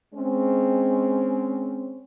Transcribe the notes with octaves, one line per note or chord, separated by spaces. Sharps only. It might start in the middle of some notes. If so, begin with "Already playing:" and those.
G#3 C4 C#4